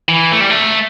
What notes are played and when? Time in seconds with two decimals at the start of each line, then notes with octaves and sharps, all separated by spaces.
0.08 E3
0.32 A3
0.40 G3
0.50 A3